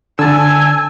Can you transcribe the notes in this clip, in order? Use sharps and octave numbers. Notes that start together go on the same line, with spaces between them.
D3 D4 G#5 A5 E6